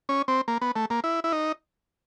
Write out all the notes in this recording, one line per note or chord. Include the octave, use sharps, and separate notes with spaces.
C#4
C4
A#3
B3
A3
A#3
E4
E4
D#4